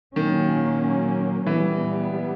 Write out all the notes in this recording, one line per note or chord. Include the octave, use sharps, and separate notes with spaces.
A#2 D#3 F#3 A#3 C#4
A#2 E3 G3 B3